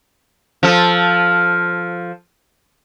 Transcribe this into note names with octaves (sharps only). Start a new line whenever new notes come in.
F3 A4